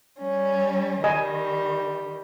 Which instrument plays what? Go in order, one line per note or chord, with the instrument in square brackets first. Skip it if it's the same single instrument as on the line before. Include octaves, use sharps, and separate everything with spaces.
[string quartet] G3 C#4
[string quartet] D#3 G3 [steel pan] D#5 G#5